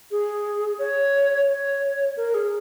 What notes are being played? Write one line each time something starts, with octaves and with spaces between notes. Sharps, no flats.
G#4
C#5
C#5
A#4
G#4